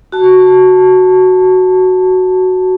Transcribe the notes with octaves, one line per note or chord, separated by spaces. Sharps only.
F#4 A5